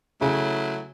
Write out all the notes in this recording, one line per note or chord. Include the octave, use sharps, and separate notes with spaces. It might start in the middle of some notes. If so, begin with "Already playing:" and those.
C#3 F#3 A3 E4